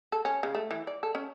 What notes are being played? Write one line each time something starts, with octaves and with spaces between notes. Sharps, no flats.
A4
C#4
C#3
A3
E3
D5
A4
C#4